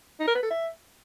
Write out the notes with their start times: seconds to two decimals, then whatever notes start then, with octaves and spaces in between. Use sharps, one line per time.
0.20 D#4
0.28 A#4
0.35 B4
0.43 A4
0.51 E5